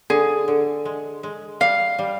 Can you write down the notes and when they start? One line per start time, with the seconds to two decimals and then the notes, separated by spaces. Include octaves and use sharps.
0.10 D3 G#4
0.48 D3
0.85 G#3
1.23 G#3
1.60 G3 F5
1.99 G3